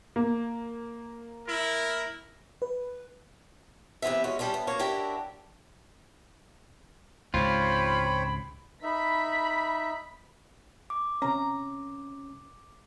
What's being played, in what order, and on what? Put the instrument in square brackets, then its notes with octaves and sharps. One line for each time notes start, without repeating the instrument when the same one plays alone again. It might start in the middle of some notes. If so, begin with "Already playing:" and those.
[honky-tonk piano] A#3
[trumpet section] E4 A#4
[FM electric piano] B4
[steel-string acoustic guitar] C3 E3 G#3 B3 E5
G#3 C#4 F#4
G3 C#4 D4 F4
B3
F#2 A#3 C#5
D4 E4 F#4 G4 A#4
[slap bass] C#2 G#2 C3 [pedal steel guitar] F4 [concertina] C5 C#5 G5 [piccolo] B5
[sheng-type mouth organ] D#4 E5 [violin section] B5 B6
[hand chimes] D6
[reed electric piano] C3 C#4 [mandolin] A#5